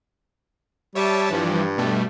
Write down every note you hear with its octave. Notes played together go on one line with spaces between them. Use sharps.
G3 C#5 E5 A5
G2 E3 F3 G3
B2 G3 A3